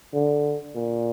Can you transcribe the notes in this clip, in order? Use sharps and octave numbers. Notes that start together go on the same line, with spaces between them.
D3
A#2